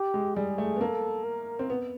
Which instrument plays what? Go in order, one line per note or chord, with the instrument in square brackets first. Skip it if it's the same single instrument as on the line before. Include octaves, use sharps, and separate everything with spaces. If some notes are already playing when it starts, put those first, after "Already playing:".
Already playing: [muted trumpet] G4
[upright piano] G#3
[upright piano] G3 [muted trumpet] G#4
[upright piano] A3
B3
[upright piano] A#3 [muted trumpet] A4
[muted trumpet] A#4
[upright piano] C4
B3